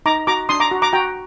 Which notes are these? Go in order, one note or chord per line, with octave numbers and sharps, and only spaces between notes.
D#4 A#5 D6
F#4 A#5 D6
D4 C6 D#6
A#5 D6
F#4
A#5 D6
F#4 G5 A#5